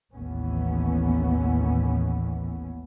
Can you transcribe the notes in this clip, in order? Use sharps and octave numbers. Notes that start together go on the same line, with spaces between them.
A1 D#2 A2 E3 B3 C#4